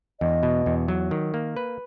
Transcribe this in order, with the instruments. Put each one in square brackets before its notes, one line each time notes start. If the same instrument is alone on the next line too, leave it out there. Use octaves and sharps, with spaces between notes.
[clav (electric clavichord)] E2 [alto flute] D#5
[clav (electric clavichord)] B2
E2
F#3
D#3
A#3
B4